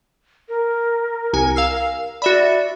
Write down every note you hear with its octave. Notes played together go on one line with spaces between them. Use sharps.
A#4
C2 G#5
F5 E6 C7
F#4 D5 E5 B5